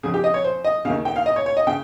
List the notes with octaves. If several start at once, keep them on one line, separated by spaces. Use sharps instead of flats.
F2 C#3 G#4
G4
D#5
C#5
C5
D#5
D#2 C#3 F5
G5
F5
D#5
C#5
C#5
D#5
C#3 G5